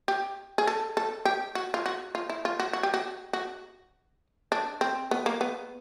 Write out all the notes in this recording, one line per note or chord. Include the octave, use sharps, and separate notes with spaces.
G4
G#4
A4
A4
G4
F#4
F4
F#4
F4
E4
F4
F#4
F#4
G4
F#4
F#4
D4
C4
B3
A#3
B3